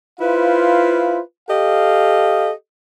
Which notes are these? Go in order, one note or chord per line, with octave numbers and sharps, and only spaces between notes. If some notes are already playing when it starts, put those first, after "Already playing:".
E4 F4 B4 C5 F5
G4 A4 D#5 F5